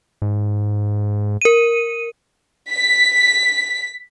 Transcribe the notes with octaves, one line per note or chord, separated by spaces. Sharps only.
G#2
A#4 D#7
B6